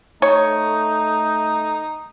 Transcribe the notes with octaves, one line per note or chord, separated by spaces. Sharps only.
A3 D#4 C#5